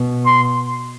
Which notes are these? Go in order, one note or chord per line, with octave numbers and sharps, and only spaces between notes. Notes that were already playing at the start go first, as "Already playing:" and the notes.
Already playing: B2
C6